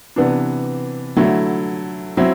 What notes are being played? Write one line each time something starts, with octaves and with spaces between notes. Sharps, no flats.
C3 E3 B3 D4
D3 F#3 A3 E4
F#3 C4 E4